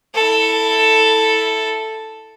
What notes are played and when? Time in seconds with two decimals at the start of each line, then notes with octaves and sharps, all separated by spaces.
0.14 E4 A4